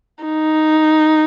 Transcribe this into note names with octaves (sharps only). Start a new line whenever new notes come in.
D#4